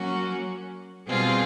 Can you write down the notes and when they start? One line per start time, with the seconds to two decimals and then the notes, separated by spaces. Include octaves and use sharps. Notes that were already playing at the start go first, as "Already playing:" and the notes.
Already playing: F#3 A#3 C#4 F#4
1.07 B2 G3 C4 F4 G#4